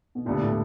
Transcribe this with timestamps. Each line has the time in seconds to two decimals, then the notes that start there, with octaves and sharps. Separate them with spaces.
0.15 B2
0.25 E1 D2 A#2 D3 G3 B3
0.41 A2